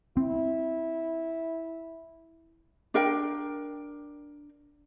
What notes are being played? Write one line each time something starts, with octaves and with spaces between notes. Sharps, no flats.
C4 E4
D4 A#4 G5